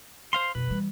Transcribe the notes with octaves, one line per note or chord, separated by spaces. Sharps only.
C5 F5 C6
F#2 B2 B4
E3 G3